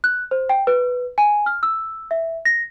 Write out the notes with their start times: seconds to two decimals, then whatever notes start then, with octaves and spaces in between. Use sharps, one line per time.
0.04 F#6
0.31 C5
0.49 G5
0.67 B4
1.18 G#5
1.46 F6
1.63 E6
2.11 E5
2.45 A#6